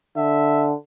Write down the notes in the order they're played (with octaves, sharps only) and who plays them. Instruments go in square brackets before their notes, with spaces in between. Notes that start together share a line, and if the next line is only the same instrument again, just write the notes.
[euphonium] D3 [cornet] E5